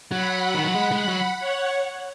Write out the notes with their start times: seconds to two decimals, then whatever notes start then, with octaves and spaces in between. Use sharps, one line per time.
0.11 F#3 F#5 B5
0.54 D#3
0.64 F#3
0.75 G#3
0.92 G#3
1.08 F#3
1.40 C#5 F#5